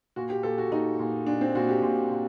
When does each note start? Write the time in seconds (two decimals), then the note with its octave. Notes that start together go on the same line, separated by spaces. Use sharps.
0.16 A#2 F#4
0.30 G4
0.43 A#2 A4
0.58 F#4
0.71 A#2 D#4
0.99 A#2
1.27 A#2 D4
1.41 C4
1.55 A#2 F#4
1.69 G4
1.82 A#2
2.11 A#2